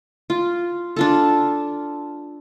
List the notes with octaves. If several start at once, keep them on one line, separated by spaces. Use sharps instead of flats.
F4
D4 F4 A4